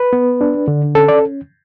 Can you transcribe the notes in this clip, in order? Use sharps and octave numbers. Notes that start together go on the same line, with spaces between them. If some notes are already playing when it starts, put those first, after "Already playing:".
Already playing: B4
B3
D4
D3
C#4 A4
D5